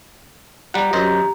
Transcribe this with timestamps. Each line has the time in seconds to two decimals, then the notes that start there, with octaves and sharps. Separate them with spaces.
0.74 G3 G4 F#5 A#5
0.93 F#2 C5 D#5